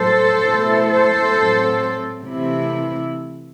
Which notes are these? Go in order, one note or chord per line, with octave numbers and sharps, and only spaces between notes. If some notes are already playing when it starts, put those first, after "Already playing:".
Already playing: A2 F#3 A3 A4 C5
B2 A3 E4
A4 C5
A2 F#3 C4
C3 E3 A3 E4